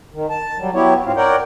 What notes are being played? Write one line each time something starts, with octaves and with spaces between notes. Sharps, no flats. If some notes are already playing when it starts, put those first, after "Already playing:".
D#3
A5
F#3 G3
F#3 B3 E4 G4 C#5
G#2 C4 F4
A#4 C#5 D5 F#5 G5